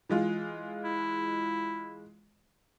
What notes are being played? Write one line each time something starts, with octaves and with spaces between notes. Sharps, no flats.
E3 G#3 F4
E4